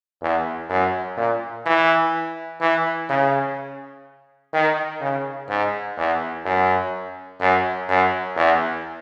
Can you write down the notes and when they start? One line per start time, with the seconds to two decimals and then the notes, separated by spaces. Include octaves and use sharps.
0.22 E2
0.69 F#2
1.17 A#2
1.66 E3
2.61 E3
3.10 C#3
4.54 D#3
5.01 C#3
5.49 G#2
5.98 E2
6.45 F#2
7.41 F#2
7.88 F#2
8.36 E2